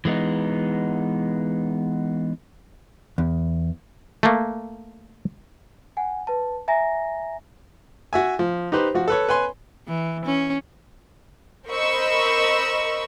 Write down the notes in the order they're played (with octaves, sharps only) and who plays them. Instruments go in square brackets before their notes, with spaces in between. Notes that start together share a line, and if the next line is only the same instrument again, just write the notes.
[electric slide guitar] E3 G#3 B3 D#4
[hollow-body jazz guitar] E2
[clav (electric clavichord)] A3 A#3
[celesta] F#5 G#5
B4 A5
E5 G#5 A#5 A#6
[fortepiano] F#4 E5 G#5
F3
D#4 G4 B4 C5
F3 F#4
A4 B4 C#5
B4 C#5 G#5 C6
[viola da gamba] E3
C#4
[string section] A#4 C5 D#5 B5 C#6 E6